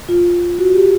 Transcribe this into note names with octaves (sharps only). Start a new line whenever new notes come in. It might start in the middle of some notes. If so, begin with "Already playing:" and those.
F4
F#4
G4